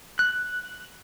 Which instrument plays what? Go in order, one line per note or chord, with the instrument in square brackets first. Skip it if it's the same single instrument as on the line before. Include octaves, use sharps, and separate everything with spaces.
[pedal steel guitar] F#6